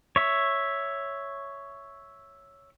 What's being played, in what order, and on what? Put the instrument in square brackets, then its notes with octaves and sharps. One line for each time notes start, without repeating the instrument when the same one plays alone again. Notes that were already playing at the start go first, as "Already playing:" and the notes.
[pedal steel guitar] C#5 E5